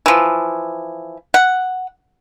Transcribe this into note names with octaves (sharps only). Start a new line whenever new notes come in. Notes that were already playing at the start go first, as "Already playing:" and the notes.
E3 F3
F#5